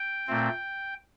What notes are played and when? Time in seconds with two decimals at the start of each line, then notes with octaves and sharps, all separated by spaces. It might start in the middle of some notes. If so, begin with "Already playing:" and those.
Already playing: G5
0.27 A#2 A3 C4